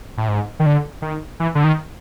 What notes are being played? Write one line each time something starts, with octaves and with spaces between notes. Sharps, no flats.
A2
G#2
D#3
D3
D#3
E3
D3
D#3